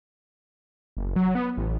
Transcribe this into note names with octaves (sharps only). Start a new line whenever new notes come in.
F#1
F#3
B3
A1